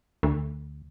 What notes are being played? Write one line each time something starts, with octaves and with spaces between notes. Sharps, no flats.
D2